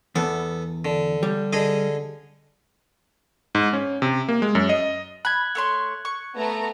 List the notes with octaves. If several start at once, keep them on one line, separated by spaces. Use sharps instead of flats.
E2 B3 A4
D3
G3
D3 G#4 D#5
G#2
C#4
C3
A#3
G#3
F#2
D#5
B5 F#6 G#6
A3 C#5 C6
C#6
A3 B3 A#5